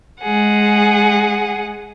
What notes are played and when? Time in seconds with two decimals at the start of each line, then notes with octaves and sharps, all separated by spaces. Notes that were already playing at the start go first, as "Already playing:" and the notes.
0.22 G#3 G#4 F#5